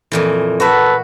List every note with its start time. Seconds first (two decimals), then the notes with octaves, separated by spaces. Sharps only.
0.12 F2 A#2 E3
0.60 F#4 A4 B4 E5